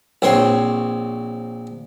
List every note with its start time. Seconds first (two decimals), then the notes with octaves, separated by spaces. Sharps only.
0.22 A#1 C4 C#5 C6